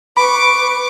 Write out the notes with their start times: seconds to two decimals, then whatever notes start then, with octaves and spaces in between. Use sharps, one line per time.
0.17 B4 B5 C#6 D6